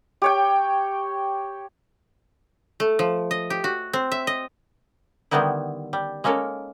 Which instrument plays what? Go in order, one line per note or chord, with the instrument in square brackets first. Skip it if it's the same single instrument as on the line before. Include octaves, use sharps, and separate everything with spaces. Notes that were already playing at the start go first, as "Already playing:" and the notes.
[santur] G4 C#5 G5
[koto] A3
F3
D#5
G4
F#4
C4
E5
D#5
D3 D#3 G3 B3 D#4 E4
G3
G#3 A#3 C#4 A4 A#4